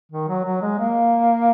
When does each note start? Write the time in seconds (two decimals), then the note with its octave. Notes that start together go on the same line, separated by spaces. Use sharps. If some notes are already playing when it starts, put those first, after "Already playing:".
0.12 D#3
0.28 F#3
0.44 F#3
0.62 G#3
0.79 A#3